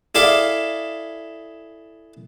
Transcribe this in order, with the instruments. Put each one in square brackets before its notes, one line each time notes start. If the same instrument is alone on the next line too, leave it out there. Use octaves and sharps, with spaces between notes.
[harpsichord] E4 G#4 A4 D5 E5 F5